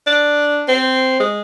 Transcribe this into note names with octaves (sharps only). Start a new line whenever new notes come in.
D4
C4
G#3